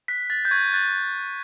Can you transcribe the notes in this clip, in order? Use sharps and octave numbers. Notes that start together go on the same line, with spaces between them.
F#6 B6
F#6 A6
G6
C#6 G#6
F#6 A6